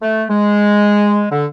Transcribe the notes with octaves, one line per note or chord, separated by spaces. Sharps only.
A3
G#3
D3